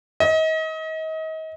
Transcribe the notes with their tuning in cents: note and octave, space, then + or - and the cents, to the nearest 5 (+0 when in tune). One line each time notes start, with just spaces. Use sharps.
D#5 +35